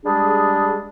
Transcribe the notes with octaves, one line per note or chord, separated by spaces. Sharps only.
G3 G#3 D4 G#4